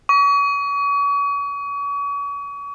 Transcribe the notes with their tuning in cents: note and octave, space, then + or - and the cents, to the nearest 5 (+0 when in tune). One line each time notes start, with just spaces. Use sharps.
C#6 +40